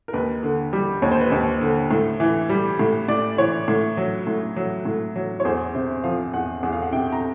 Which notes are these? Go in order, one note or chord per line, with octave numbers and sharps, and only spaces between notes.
A#4
D#2 B4
D3
G3
D#2 C#5
C5
B4
D#2 C5
D3
A2
E3
G3
A2
A2 D5
E3 C#5
A2
F#3
A2
F#3
A2
F#3
C#5
E2 C5
C3 C5
F3 F5
E2 F#5
E2 F#5
F5
F#5
C3 G5
A#5